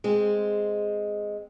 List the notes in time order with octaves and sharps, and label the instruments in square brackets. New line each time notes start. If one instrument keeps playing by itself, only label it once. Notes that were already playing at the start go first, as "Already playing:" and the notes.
[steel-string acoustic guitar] G#3 C4